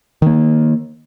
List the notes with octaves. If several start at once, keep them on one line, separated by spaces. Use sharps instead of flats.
D#3 A#3